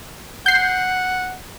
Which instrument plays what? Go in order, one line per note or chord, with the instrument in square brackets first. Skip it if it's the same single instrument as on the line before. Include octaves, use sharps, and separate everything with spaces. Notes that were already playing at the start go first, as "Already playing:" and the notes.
[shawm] F#5 [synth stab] G6 C7